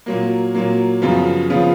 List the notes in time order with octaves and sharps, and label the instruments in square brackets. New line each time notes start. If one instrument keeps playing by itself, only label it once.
[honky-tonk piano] A#2 F#3 A#3
A#2 F#3 A#3
F#2 C#3 F3 B3 F4
C#3 F3 B3 F4